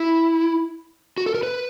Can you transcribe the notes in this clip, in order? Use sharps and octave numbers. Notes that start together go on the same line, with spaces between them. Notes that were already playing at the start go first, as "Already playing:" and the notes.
Already playing: E4
F#4
A4
A#4
B4